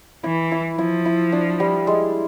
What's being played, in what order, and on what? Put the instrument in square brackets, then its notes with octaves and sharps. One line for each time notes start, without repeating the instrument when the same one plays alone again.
[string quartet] E3 [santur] E4
[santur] E4
[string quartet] F3 [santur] E4
[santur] E4
D4
G3
G#3